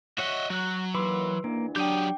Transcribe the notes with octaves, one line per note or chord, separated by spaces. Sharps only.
F#4 C#5 D#5 E5 F#5 B6
F#3 F#4 F#6
D#2 E3 B4 B5 C6 D6 E6
D#2 G#2 E3 A#3 D4
F#3 D4 G4 G5 D6 D#6 G6